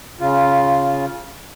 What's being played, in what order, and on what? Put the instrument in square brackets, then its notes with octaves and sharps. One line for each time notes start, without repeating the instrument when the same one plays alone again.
[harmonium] C#3 F4